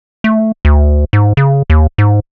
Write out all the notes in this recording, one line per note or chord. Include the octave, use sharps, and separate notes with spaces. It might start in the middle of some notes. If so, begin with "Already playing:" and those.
A3
D2
G#2
C#3
D#2
G#2